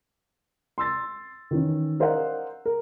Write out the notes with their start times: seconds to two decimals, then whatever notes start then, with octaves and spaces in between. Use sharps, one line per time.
0.78 C6 E6 A6
1.51 D#3 E3 C#4
2.00 A#4 C5 D5 D#5 F5 F#5
2.66 A#4